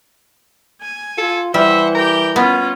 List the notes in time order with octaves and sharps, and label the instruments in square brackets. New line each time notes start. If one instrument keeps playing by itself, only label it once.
[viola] G#5
[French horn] F4 [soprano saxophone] A4
[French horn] E3 [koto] G3 [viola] C5 F#5 [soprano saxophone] E5
[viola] G4 G5 [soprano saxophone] A#4
[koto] B3 [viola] C#4 F4